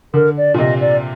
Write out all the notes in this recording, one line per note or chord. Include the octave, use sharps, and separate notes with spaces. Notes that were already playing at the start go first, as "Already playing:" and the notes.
D3 A#4
D5
A#2
C3 D#5
D5